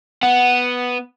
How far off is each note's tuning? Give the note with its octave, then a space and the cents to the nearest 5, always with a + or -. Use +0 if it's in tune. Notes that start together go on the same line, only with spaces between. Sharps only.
B3 +0 F#5 +0